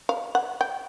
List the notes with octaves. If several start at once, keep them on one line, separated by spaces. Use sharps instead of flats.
F5
F#5
G5